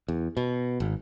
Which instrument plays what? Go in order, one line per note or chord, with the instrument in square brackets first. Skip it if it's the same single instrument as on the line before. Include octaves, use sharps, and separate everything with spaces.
[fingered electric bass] E2
B2
G#1